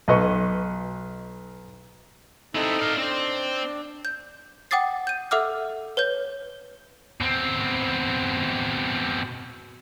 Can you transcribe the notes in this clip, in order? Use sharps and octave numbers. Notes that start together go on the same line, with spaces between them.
B1 B4 D#5 C#6
C4 D#4 E4 A4
D5 F5
C4 D4 C5
G6
F#5 G5 D6 D#6 A6 C7
G6 D#7
A4 E5 F#5 D6 E6 F6
B4 C#5 G6
B2 C4